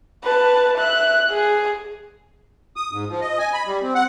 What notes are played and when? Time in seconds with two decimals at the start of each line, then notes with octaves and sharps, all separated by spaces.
0.24 B4 A5
0.78 E5 F#6
1.30 G#4
2.76 D#6
2.91 G#2
3.09 F3
3.21 D#5
3.39 G#5
3.53 B5
3.67 G3
3.83 C4
3.95 F#5